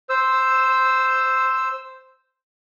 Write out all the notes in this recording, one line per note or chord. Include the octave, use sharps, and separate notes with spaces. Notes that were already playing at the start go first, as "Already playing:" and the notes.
C5 E6